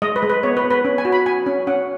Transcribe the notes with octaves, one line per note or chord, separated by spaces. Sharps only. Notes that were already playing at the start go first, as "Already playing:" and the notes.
G#3 D#5
B4
G#3
B4
B3 C#5
B4
B3
B4
C#4
G#5
F#4
B5
F#4 G#5
C#4
C#4 F#5